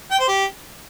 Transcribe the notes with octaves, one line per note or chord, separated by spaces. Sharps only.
G5
C5
G4